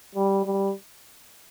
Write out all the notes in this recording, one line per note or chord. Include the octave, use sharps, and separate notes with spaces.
G3
G3